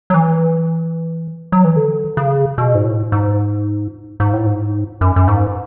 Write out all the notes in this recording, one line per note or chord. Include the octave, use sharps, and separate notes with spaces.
F#3
E3
F#3
E3
D3
C#3
B2
G#2
A2
G#2
G#2
A2
G#2
F#2
F#2
G#2